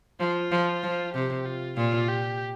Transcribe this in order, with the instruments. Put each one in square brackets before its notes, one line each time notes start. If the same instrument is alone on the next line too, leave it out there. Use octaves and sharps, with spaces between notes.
[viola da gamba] F3 [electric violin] F4
[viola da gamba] F3
F3
[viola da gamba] C3 [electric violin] G4
[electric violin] F4
[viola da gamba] A#2 [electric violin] F4
[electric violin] G4